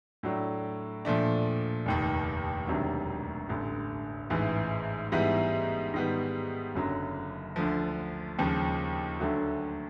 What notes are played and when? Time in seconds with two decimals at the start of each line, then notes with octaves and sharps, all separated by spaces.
0.23 A2 F#3 A3 D4
1.05 A#2 F3 A3 D4
1.86 F1 D#2 D#3
2.68 E1 D2 C3 D#3 F#3
3.49 A1 G2 D3
4.30 A1 G#2 E3
5.12 G#2 E3 G3 B3 E4
5.94 G#2 D#3 G3 B3
6.75 F#1 F#2 D3 F#3
7.56 D2 D3 F3
8.39 D#2 C#3 F3 G#3
9.20 D2 D3 F#3 A3